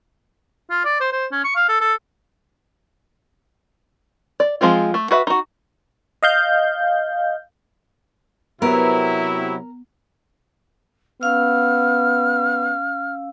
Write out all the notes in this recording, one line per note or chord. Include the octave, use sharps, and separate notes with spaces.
F4
D5
C5
C5
C#4
C#6
F5
A4
A4
D5
F3 G#3 C4 F4
A3
F#4 B4 E5
D#4 F#4
D#5 F5 G6
C3 F#3 B3 E4 A#4
B3 C#4 F5 E6 F6